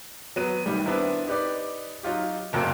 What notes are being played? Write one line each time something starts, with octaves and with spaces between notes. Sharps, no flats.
F#3 B3 D#7
C2 D#3 G3
B3 C4 D4 E4 A#4
D#4 G4 B4 D5
F#3 D#4 F4 G4
F#1 F2 C3 F#3 A#3 D7